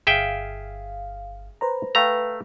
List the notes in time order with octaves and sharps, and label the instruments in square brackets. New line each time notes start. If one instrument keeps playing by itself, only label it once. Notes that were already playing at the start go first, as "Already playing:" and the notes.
[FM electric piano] G1 F5 [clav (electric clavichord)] G#4 E5 G5
[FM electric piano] B4 C5 A#5
[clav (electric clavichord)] A3 A#5 [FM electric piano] B4 F5 G5